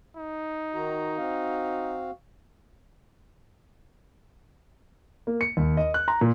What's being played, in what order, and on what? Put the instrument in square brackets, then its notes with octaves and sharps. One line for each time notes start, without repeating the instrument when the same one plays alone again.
[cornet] D#4
[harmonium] D#3 F#4 A#5
C4 F#4 F5
[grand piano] A#3
C#7
D#2
D#5
F#6
A#5
A#2